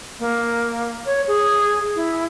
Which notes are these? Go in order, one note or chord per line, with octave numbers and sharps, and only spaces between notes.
A#3
C#5
G#4
E4